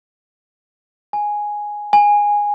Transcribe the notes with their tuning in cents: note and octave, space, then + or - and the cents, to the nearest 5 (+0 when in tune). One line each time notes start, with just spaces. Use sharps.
G#5 +0
G#5 -10